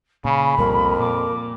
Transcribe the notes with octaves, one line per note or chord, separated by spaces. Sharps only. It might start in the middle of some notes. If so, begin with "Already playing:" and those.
A#2 C#3 B5
C2 F2 A#2 G3 A#4
A#2 D6